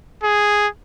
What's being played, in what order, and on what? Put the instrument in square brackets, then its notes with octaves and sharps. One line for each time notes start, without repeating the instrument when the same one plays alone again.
[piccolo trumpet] G#4